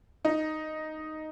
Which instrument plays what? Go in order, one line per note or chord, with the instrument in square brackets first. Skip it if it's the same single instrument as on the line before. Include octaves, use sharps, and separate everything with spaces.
[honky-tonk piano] D#4